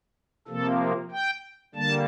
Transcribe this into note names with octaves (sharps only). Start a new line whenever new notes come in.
C3 F3 A#3 A4
G5
D3 G3 A#3 A5